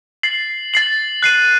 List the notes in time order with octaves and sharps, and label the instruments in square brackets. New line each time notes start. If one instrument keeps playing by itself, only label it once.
[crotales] A6 C7 F#7
A6 C7 F#7
F#6 C7 D#7